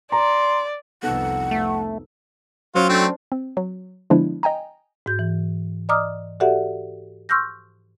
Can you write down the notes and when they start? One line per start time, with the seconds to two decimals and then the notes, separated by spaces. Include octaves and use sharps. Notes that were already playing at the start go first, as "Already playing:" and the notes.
0.12 D5 A#5 C6
1.03 C2 F2 B3 D#4 A4 F#5
1.51 A3
2.75 F#3 C#4 F4 C5
2.89 A3 C4 D4
3.32 C4
3.57 F#3
4.10 D3 F3 G#3 B3 D4 E4
4.43 D#5 G5 G#5 A#5
5.06 G#2 F#4 G6
5.19 E3
5.89 D5 D#5 A#5 D6 D#6 F6
6.40 F#4 G4 A4 D5 E5 F#5
7.29 C6 C#6 E6 F6 G6 A#6